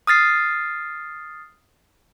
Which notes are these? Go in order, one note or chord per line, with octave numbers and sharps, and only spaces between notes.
D#6 F6 A6 C7